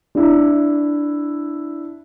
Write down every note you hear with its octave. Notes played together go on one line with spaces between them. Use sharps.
D4 E4